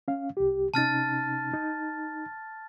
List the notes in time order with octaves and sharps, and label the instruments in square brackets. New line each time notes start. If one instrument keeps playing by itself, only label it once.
[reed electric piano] C#4 F5
C2 G4
[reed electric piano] C3 C#4 D#4 [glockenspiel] A5 F6 A6
[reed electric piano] D#4